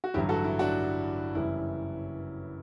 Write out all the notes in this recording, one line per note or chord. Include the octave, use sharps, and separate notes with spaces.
F#4
A1 G2 D3 F#3 E4 G4
F#4 A4
E4
D4 F#4
F#1 F#2 E3 G3 E4